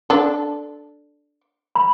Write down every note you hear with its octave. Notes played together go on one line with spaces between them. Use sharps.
D4 A4
B5